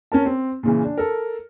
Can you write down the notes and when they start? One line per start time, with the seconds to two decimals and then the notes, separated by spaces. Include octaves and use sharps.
0.12 C#4 A#4 A5
0.25 C4
0.63 A#2 C#3 E3
0.84 D4
0.98 A4 A#4